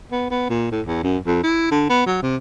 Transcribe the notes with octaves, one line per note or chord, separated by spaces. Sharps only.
B3
B3
A#2
A2
E2
F#2
F2
E4
D3
B3
F#3
C3